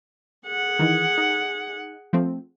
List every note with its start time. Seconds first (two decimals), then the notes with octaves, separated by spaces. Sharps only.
0.47 G#4 F#5
0.79 D#3 E3
1.18 D#4
2.13 F3 A3 C4